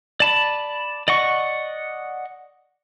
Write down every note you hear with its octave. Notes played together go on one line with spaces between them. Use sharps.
D5 A5 B5
D5 D#5 F#5 C#6